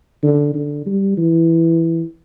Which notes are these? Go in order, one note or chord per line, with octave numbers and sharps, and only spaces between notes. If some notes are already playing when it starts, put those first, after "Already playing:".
D3
D3
G3
E3